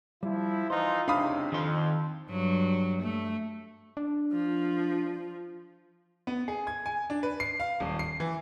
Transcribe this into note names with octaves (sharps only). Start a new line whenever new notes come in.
F3 G3 E4
E3 D#4 F4 C5
C#2 C3 D4 D#4 D5 F5 B5 D#6
F2 D#3 C6
G2 F#3
A3
D4
F3
B3
G#4
G#6
G#5
D4
B4
C7
F5
D#1
C7
E3